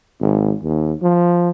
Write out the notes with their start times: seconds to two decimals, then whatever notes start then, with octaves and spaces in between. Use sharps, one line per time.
0.20 G#1
0.62 D#2
1.02 F3